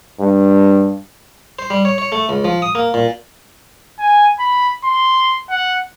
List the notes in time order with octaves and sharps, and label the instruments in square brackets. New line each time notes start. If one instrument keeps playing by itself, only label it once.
[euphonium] G2
[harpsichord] C5
G3
C#5
C#5
A3
C#2
F3
D#6
A#3
A#2
[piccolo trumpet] G#5
B5
C6
F#5